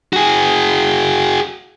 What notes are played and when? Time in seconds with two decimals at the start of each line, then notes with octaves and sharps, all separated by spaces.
0.13 F#4 G#4